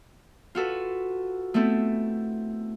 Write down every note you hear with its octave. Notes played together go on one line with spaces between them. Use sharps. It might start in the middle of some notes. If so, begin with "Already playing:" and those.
F4 F#4 A4 B4
A3 B3 C4 E4 A4